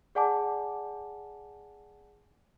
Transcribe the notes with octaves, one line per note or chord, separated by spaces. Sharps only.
G#4 D5 F#5 G#5 A5 D6